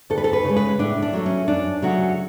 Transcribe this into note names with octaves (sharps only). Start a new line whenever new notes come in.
D2 A4
B4
A4
B4
C#3
G#3
B4
A2 D4
D4
F#3 A3
C#4
F#2 D4
C#3 F#3 A3 F#4